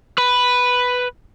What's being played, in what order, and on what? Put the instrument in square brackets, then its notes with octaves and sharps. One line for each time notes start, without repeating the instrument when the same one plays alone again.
[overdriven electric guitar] B4 B5